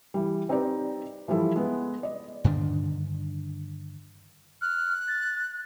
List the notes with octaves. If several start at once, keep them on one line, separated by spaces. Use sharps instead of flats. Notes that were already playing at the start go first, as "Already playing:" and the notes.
E3 G3
C4 D#4 G4 B4 D5
E3 F3 G3 E4 A4
G#3 B3
D5 D#5
G2 D3 D#3 D4
F6 F#6
A6